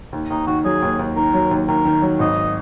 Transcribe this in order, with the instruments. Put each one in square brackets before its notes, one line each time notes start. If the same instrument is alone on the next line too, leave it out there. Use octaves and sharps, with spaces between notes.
[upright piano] D#2
[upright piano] D#2 [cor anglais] D#4
[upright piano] D#3 [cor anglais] F#4
[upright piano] F#3 [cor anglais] G#4
[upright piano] D#2
D#2
[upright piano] D#3 [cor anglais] A#4
[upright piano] F#3
D#2
[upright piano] D#2 [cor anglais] A#4
[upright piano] D#3
F#3
[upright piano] G#1 [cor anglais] D#5